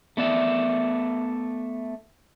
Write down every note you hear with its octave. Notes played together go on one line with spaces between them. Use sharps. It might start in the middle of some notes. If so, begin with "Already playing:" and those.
A3 B3 D5 E5